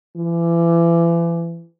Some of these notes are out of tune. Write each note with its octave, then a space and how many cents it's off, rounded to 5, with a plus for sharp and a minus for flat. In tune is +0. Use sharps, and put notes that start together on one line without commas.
E3 +35